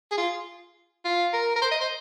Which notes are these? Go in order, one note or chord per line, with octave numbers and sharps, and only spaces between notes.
G#4
F4
F4
A#4
A#4
C5
D#5
C5